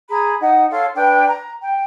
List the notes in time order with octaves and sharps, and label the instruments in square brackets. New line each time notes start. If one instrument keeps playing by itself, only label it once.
[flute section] G#4 A#5 B5
D#4 F#5
A4 C#5 F5 C6
D4 B4 G5
A#5
G5